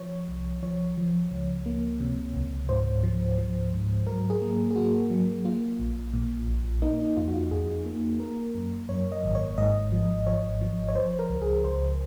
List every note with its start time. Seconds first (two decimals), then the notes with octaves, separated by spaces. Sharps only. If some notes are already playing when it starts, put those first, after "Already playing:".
Already playing: F3 C#5
0.28 C2
0.63 F3 C#5
0.97 F3
1.31 C#2
1.66 A#3
2.00 C3
2.34 C#2
2.69 G#2 C5
3.03 F3
3.38 F3
3.73 G#2
4.07 F#3 A#4
4.30 G#4
4.42 A#3
4.71 G#4
4.76 A#3 F#4
5.10 F#3
5.45 A#3 F4
5.79 A#1
6.13 A#2
6.47 A#1
6.82 A#3 D#4
6.99 D#4
7.17 F2 F4
7.28 F#4
7.34 F4
7.51 F2 G#4
7.86 A#3
8.20 A#3 A#4
8.55 F#2
8.89 F#2 C#5
9.12 D#5
9.24 G#1
9.35 C#5
9.58 G#2 D#5
9.92 F3
10.26 F3 C#5
10.61 F3
10.89 C#5
10.95 F3 C5
11.19 A#4
11.30 C#2
11.42 G#4
11.64 C#2 C5